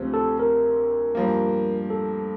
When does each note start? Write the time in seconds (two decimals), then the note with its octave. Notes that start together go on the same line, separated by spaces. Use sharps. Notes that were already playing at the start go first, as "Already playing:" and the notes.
Already playing: D2 C3 F3 C4
0.14 A4
0.39 A#4
1.15 G2 F3 A#3
1.90 A4